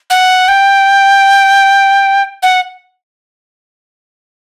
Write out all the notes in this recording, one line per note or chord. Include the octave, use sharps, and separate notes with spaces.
F#5
G5
F#5